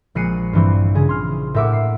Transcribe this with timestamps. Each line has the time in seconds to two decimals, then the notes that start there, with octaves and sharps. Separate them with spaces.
0.15 A#1 G#3 F#6 C7 C#7 D#7
0.53 G2 E3 C4
0.95 C#3 G#4
1.09 C6 F6
1.54 A2 A#4 E5 F#5 D6
1.73 C7